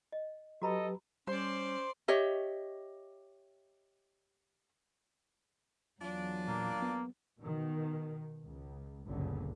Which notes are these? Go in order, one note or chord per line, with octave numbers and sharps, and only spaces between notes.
D#5
F#3 F#4 G4 A4 B4 D#5 A#5 B5
G3 C#4 C5 D5 C6
G4 C#5 D#5 E5
E2 F#3 D4 F4
A#2 A#3
B3
B2 D#3
C#2
G1 C#2 F#2 A#2 D3